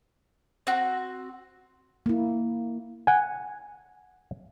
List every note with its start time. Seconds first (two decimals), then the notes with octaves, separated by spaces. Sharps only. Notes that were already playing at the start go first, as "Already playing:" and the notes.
0.67 C4 F#4
2.06 A#3 E4
3.07 F#5 G#5